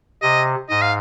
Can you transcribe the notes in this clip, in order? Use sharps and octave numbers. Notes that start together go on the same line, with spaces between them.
C3 D#5
G#2 D#5
F5